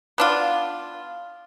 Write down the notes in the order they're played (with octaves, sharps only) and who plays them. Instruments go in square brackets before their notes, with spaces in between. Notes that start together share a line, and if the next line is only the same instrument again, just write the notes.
[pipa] B3 D4 F4